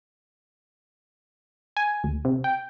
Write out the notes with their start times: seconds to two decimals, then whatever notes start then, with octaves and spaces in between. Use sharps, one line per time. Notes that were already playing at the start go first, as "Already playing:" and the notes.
1.77 G#5
2.04 D2
2.25 C3
2.44 G5